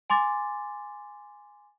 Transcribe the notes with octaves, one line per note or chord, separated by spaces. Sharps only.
G#5 C6 D6 A6